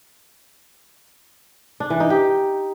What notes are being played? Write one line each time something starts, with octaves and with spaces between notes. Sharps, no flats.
D4
E3
D#4
G4